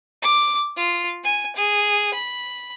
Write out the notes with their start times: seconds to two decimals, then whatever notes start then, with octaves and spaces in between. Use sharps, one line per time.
0.22 D6
0.77 F4
1.24 G#5
1.56 G#4
2.14 B5